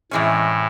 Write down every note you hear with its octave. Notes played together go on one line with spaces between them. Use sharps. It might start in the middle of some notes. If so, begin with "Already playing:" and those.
A2 C3 E3 G#3 C#4